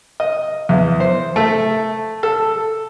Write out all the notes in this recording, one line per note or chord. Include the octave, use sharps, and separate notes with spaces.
D#5
E2
C5
A3
A4